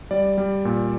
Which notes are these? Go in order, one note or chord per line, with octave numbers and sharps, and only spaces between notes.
G3 D5
G3
A#2